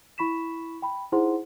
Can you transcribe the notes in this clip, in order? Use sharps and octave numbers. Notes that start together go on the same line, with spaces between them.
E4 B5 C#6 B6 E7
G5 B5
D#4 E4 G#4 C5 F#5 C6